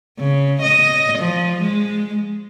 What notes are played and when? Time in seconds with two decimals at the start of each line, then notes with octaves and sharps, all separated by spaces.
0.18 C#3
0.62 D#5
1.19 F3
1.62 G#3